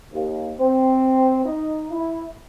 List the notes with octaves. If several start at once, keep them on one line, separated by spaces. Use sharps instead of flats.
D#2
C4
D#4
E4